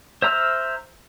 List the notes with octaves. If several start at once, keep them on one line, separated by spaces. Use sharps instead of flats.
C5 E5 A#5 E6 F6